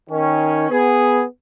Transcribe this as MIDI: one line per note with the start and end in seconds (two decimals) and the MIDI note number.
0.10 0.68 51
0.10 0.68 61
0.70 1.23 59
0.70 1.23 68